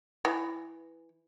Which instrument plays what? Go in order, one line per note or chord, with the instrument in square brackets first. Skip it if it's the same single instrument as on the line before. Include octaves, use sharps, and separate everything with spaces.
[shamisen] E3